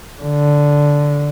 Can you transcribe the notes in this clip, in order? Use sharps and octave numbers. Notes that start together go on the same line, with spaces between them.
D3